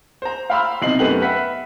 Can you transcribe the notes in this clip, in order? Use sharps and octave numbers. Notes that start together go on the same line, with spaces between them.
C5 A#5
F5 G5 B5 C6 E6 F6
B1 C3 D#4 C7 F#7
F#2 A3 B3 G4 F#7
B4 E5 F#5 B5 B6